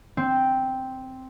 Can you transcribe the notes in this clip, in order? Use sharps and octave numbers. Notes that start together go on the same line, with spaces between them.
C4